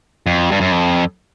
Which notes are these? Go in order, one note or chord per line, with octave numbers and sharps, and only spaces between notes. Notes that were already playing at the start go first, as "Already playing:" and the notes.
F2
G2
F#2
F2